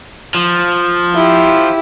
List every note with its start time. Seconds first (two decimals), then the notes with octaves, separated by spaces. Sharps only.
0.35 F3
1.14 E4 G4